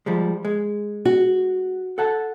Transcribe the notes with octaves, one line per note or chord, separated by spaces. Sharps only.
F3 G3 G#3
G#3
F#4
A4 F#5 A5